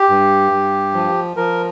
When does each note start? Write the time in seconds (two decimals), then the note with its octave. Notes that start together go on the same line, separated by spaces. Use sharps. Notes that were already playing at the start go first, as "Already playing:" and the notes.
Already playing: G4
0.10 G2
0.51 G2
0.94 F3
1.36 F3 A#4